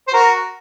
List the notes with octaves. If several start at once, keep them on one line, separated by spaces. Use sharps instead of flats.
C5
F#4 A#4